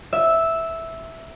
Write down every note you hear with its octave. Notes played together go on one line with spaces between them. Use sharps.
E5